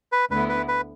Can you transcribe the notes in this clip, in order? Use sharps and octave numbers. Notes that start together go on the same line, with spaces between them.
B4
D2 D3 B3 E4 B4
B4
B4